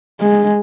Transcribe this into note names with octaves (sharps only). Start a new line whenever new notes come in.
G#3